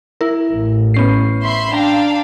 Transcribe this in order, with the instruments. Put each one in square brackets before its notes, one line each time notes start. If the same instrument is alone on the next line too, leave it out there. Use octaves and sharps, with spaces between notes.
[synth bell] E4 A#4
[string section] A1
[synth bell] B3 C#4 C7
[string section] E5 B5 C6
[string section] D4 F5 G5 [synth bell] A#5